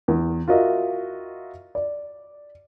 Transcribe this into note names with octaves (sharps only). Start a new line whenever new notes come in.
E2
F4 F#4 A#4 D#5 E5
D5